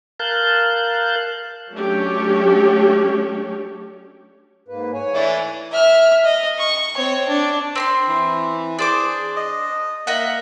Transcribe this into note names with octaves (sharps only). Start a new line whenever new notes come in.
A#4 F5 A5 F#6 G6
F#3 A3 C#4 D4 G4 C#5
G#2 A#3 B4
C#5 G#5
E3 A3 D4
E5 F6
D#5
C#6
C4 C#5
D4
C4 B5 C6
E3
D4 G#4 C5 D6
D#5
A#3 D#5 E5 F#5